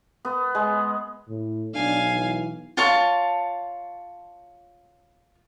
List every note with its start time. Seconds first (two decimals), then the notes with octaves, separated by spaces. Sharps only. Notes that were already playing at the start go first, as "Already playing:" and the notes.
0.25 B3
0.55 G#3
1.29 A2
1.74 B1 D4 F5 G#5
2.15 E3
2.77 F4 C#5 A5